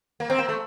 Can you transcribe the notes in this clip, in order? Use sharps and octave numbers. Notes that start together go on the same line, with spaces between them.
A#3
C4
A#3
A3